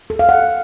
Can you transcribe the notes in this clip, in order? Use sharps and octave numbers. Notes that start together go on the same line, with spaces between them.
A4
F5
F#5